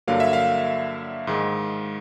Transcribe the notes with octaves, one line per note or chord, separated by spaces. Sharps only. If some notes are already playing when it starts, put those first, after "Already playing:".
G2 D3 F#3 A#3 F5
E5
F5
G#2 D#3 G#3